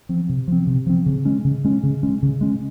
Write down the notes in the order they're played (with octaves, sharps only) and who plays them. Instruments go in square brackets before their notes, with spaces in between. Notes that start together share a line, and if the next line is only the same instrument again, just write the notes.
[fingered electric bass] F3 C4
C3
F3 C4
C3
F3 C4
C#3
G#3 C#4
C#3
G#3 C#4
C#3
G#3 C#4
C#3
G#3 C#4